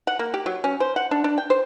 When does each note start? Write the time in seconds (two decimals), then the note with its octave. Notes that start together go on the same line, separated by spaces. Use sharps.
0.07 F#5
0.19 A#3
0.34 G4
0.46 F#3
0.64 C#4
0.80 C5
0.96 F#5
1.11 D4
1.24 D4
1.38 G5
1.50 C5